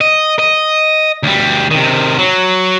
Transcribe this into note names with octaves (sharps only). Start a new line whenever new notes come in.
D#5
D#5
D2 G3
C3 D#3
F#3